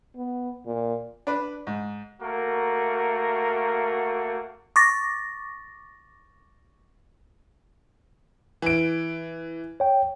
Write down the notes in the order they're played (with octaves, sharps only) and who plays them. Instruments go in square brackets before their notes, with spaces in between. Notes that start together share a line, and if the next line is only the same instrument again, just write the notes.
[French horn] B3
A#2
[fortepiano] D4 B4
G#2
[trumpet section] A3 A#3 F#4 A#4
[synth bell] C#6 D6 A6 A#6
[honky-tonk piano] E3 D7
[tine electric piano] C#5 G5